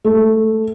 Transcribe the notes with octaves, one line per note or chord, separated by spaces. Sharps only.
A3